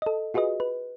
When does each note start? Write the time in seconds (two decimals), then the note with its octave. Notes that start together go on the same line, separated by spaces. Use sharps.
0.02 A4 D#5
0.34 F4 F#4 G#4 B4 D#5
0.60 B4